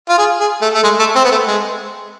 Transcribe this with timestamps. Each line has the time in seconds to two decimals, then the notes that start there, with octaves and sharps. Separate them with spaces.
0.09 F4
0.18 G#4
0.40 G#4
0.62 A3
0.74 A3
0.83 G#3
0.99 A3
1.15 C4
1.24 B3
1.32 A3
1.47 G#3